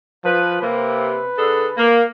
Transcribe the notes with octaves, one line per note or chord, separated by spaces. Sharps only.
F3 B4
C3 A#3 B4
D3 G#4 A4
A#3